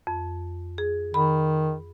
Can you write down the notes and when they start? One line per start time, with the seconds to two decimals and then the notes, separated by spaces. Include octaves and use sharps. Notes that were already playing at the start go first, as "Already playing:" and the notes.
0.07 F2
0.78 G#4
1.14 D#3 B5